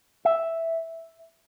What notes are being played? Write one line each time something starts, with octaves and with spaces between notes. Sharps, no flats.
E5